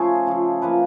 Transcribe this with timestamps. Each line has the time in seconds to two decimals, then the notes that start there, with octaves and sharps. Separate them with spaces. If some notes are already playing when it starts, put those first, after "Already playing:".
Already playing: C#3 F3 A3 G#4
0.27 C#3 F3 A3
0.61 C3 F3 A#3 B4